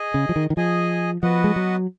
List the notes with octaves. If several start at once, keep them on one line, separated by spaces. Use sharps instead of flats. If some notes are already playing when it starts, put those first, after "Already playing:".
Already playing: G#4 D#5 G#5
C#3
F3
D#3
D#3
F3 G#4 D#5 G#5
F3 B3 F#4 B4 D#5 F#5
G#3
F#3